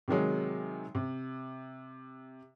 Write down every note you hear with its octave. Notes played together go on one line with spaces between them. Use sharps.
C3 D#3 F#3 G#3
C3